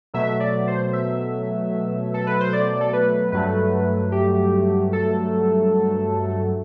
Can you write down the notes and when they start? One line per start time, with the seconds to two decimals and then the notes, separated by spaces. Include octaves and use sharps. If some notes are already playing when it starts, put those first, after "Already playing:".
0.14 B2 F#3 A3 E5
0.40 D5
0.67 C5
0.93 E5
2.14 A4
2.27 B4
2.40 C5
2.53 D5
2.81 A4
2.93 B4
3.32 G2 F#3 A3 B4
4.12 G4
4.93 A4